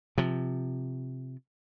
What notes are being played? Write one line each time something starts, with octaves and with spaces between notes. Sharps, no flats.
C3 F3